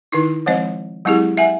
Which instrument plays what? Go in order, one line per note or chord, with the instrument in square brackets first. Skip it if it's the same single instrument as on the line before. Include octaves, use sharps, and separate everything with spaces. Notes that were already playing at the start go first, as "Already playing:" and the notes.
[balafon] D#3 D#4 E4
F3 G#3 C4 C5 D#5
F#3 G#3 C4 E4 G4 G#4
E5 F#5 G#5